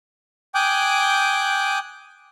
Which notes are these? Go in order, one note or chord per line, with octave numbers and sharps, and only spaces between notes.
G5 G#5 D6 D#6 F#6 G6